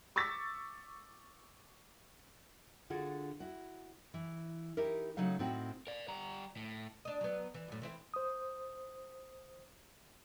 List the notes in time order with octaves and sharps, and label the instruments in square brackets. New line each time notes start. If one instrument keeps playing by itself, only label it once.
[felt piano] C#6 D6 E6 A6 B6
[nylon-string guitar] D3 F4 F#4 G#4
E4 F#4
E3
D#4 E4 G4 A#4
C#3 F#3 A3 D#4 F5
A2 C4 D#4 F#4
[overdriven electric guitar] A#4 D5
G3 A#5
A2
[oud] D4 D#5
F#3 B3
E3
F#2 A2
E3 C4 E4
[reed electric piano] C5 D#6